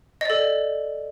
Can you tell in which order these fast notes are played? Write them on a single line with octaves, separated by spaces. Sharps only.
D#5 D5 A4